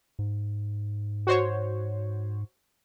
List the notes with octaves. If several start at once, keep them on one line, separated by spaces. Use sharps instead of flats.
G#2
F#4 C5 C#5